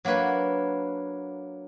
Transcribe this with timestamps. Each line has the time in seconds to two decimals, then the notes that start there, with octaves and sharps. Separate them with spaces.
0.05 F#3 A#3 D4 B4 C#5